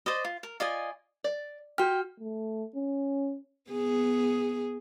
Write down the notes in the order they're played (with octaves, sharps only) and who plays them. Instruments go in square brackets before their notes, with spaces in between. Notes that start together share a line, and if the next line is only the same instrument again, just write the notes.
[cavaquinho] C5 D5 D#5
F4
A#4
F4 D5 D#5 G#5
[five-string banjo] D5
[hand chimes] F#4 F6 [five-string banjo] G4
[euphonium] A3
C#4
[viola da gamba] B3 G#4